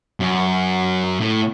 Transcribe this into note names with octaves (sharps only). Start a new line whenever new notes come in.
F#2
A2